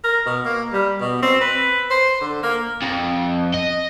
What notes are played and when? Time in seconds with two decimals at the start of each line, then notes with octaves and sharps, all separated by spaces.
0.04 A#4
0.26 B2
0.45 A#3
0.73 G3
1.01 B2
1.22 C4
1.41 B4
1.91 C5
2.21 D3
2.43 A#3
2.82 F2
3.54 D#5